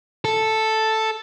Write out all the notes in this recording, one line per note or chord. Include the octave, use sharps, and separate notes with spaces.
A4